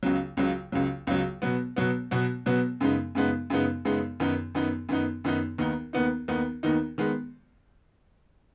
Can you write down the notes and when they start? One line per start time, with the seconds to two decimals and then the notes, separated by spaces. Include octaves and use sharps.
0.03 C#2 C#3 F#3
0.37 C#2 C#3 F#3
0.72 C#2 C#3 F#3
1.07 C#2 C#3 F#3
1.42 B2 F#3 B3
1.76 B2 F#3 B3
2.11 B2 F#3 B3
2.46 B2 F#3 B3
2.81 F#2 C#3 G#3 B3 D#4
3.15 F#2 C#3 G#3 B3 D#4
3.50 F#2 C#3 G#3 B3 D#4
3.85 F#2 C#3 G#3 B3 D#4
4.20 F#2 D#3 B3 D#4
4.55 F#2 D#3 B3 D#4
4.89 F#2 D#3 B3 D#4
5.24 F#2 D#3 B3 D#4
5.58 D#2 D#3 B3 D#4
5.93 D#2 D#3 B3 D#4
6.28 D#2 D#3 B3 D#4
6.63 D#2 D#3 B3 D#4
6.98 D#3 G#3 B3